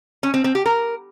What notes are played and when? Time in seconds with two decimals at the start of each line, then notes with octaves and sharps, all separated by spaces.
0.23 C#4
0.34 C4
0.44 C4
0.55 G4
0.66 A#4